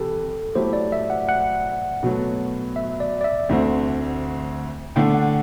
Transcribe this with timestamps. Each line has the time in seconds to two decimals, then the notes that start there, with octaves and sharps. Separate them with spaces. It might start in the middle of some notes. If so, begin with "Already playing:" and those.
Already playing: C3 E3 G3 G4 A4
0.55 F#3 A3 E4 G4 C5
0.73 D5
0.92 E5
1.10 F#5
1.29 F#5
2.03 B2 F#3 A3
2.76 E5
3.00 D5
3.21 D5
3.24 E5
3.49 D2 D3 A3 C4
4.96 D3 A3 D4 G5
5.14 F#5